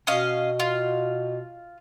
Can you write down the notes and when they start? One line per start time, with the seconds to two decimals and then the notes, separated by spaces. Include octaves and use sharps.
0.07 B2 C#4 D#5 F5
0.60 F4